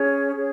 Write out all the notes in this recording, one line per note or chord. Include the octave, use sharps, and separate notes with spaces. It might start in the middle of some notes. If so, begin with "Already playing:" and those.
Already playing: C#4 G#4 C#5
C#4 G#4 C#5